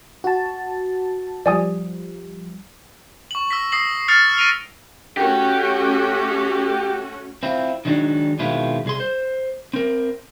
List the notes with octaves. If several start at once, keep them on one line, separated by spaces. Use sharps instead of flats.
F#4 A5
F3 G3 D5 G#5 D#6
C#6 F#7
E6 A#6 B6
D#6 A#6 C7 F#7
D#6 F6 A6 C7 C#7 F7
A#6 D7 D#7 F7 G7
A3 C#4 F#4 G4
C4 E4 F4
D#3 F#3 G#3 C4 D4 D#4
B2 D#3 G#3 C4 E4 F4
C2 G#4 C6
C5
C4 A#4